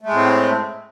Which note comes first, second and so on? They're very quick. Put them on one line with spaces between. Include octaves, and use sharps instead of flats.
A3 G#3 A2 C4